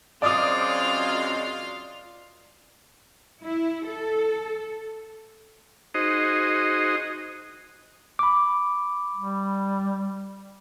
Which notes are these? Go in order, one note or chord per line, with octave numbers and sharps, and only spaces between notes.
F#2 G#3 C4 F4 D5 F5 D6 D#6
E4
A4
D#4 F#4 G#4 C5 D#5
B5 D6
G3